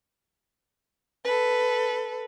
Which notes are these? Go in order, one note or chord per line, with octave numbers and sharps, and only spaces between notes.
A4 B4